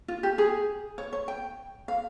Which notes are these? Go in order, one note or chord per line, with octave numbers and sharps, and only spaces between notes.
F4
G4
G#4
C#5
C#5
G5
F5